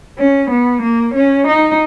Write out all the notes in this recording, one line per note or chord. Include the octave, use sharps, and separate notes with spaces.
C#4
B3
A#3
C#4
D#4